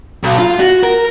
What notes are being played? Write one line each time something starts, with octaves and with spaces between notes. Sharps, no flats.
B1
F4
F#4
A#4